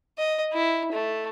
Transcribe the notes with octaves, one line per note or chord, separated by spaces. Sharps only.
D#5
E4
A3